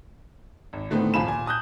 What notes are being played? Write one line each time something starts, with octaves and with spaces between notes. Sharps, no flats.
G#1
A2 D3 D#3 A3 B3 C4
D#1 F3 F5 G#5 B5 E7
A#2 G#5
A5 D#6 F#6 G6